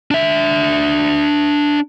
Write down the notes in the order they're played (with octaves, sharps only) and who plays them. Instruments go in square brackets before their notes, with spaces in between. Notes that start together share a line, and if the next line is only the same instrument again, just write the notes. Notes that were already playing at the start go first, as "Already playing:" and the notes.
[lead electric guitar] D4 E5